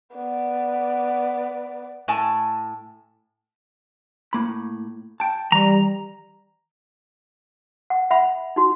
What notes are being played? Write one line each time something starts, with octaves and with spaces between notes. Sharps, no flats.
B3 D5
A2 G#5 A5
A2 A#3 B5
G5 A5
E3 G3 A#5
F#5
E5 F#5 B5
D#4 F#4